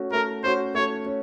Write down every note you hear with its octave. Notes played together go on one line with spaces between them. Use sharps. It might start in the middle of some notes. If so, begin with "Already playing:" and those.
Already playing: A3 C#4 F#4
A3 A#4
C#4 F#4 C5
A3 C#5
C#4